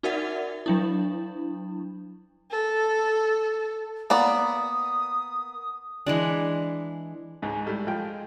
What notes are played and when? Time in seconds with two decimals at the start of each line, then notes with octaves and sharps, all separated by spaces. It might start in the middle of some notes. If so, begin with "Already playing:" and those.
0.03 D#4 F#4 A#4 D5 E5 F#5
0.66 F#3 D4 E4
2.50 A4
4.10 A#3 B3 D5 D#6
6.06 E3 G#3 D4
7.42 C#2 G#2 G#3
7.66 A2 G3
7.87 F3 G5